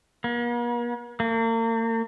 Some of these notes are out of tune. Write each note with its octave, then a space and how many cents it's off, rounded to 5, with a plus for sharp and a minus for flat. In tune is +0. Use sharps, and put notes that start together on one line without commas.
A#3 +45
A#3 -40